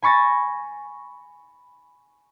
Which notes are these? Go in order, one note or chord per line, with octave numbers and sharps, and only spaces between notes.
G#5 B5 C#6 A6 A#6